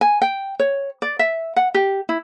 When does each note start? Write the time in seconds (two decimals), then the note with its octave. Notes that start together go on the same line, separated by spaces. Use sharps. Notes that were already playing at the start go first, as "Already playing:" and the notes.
0.01 G#5
0.22 G5
0.59 C#5
1.02 D5
1.19 E5
1.56 F#5
1.74 G4
2.09 E4